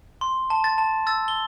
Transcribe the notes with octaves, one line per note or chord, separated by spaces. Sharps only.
C6
A5
A6
A5
E6 A6
G7